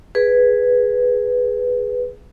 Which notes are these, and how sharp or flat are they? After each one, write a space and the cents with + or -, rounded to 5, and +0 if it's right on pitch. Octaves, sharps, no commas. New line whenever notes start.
G#4 +0 B4 +0